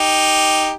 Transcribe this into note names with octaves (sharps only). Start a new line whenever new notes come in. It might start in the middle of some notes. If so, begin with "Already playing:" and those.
Already playing: D#4 G4